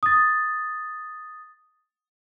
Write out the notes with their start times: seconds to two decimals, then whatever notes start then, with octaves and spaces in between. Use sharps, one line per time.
0.03 D#6 A6